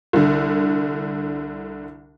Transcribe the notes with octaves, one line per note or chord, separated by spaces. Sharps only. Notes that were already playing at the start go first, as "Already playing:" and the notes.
C2 D3